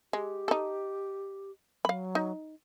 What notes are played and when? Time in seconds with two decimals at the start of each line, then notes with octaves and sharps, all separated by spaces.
0.13 G#3 G4
0.48 D#4 A4
1.85 F#3 F5 B5
2.15 D#4